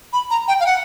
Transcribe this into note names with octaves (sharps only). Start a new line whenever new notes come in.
B5
A#5
G5
F5
F#5